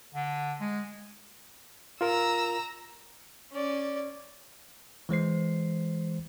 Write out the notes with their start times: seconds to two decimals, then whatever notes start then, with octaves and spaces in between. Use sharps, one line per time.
0.15 D3
0.61 G#3
2.01 F4 A#4 A#5 E6
3.52 C#4 D5
5.09 E3 G#3 C5 C7